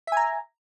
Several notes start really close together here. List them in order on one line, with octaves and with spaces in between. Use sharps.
E5 G#5 A#5